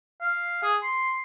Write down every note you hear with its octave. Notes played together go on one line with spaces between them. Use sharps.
F5
G#4
C6